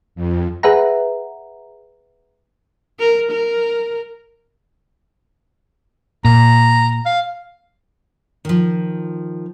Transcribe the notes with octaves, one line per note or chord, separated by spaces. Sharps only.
F2
G#4 B4 E5 F#5 A#5
A#4
A#4
A#2 A#5
F5
D#3 F3